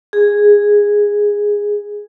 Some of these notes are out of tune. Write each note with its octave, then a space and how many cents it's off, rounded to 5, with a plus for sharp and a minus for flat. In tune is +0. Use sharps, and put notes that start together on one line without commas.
G#4 -10